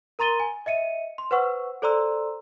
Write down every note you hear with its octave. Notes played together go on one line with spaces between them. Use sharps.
A#4 A#5 C6 A6 D#7 G7
G#5
D#5 E5 C#7 D#7
C6
B4 C5 F#5 C#6 E6
A4 C5 D5 A#5 C6 E6